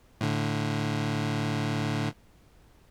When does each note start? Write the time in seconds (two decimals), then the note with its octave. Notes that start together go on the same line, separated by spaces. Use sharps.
0.21 A2 D3